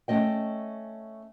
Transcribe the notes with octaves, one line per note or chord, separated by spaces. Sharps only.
A3 C#4 D#5 G5